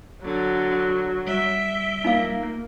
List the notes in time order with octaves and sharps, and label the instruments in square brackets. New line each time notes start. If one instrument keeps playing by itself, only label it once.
[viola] D3 [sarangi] F#3
[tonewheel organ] G3 [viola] E5
[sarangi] A#3 [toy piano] D#4 F4 F5